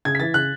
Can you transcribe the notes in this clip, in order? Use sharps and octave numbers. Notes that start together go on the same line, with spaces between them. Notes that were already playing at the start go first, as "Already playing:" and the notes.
C#3 G#6
B6
E3 A6
C#3 F#6